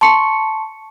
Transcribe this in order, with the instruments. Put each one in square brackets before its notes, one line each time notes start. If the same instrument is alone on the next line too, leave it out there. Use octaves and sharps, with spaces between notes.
[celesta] A5 C6 C#6 C#7